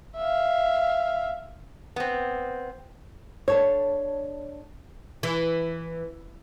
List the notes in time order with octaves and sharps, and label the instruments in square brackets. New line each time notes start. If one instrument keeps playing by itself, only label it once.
[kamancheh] E5 F5
[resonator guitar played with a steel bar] B3 C4
[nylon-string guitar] D4 A4 C#5
[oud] E3